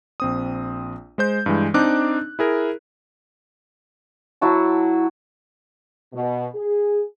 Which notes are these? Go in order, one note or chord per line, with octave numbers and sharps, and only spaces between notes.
A#1 C4 D#6
G#3 C5 G6
G2 E3 G#3
C4 D4 D#4 D6 F#6
E4 G#4 A#4
F#3 E4 F#4 A5
B2
G#4